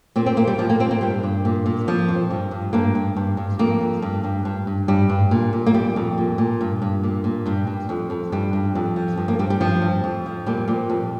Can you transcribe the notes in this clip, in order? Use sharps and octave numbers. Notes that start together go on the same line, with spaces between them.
A#2 C4
C4
A#2 A#3
G3
A#2 F3
A#3
A#2 C4
A#3
G2 G3
G2
A#2
A#2
F2 F3
F2
G2
G2
G2 A#3
G2
G2
G2
F2 A#3
F2
G2
G2
G2
G2
G2 G3
G2
A#2
A#2
A#3
F2 G3
F2
A#2
A#2
G2
G2
A#2
A#2
G2 G3
G2
F2
F2
G2 G3
G2
F2
F3
G2
A#3
G2 G3
G3
G2 F3
G2
F2
F3
A#2 G3
A#2
F2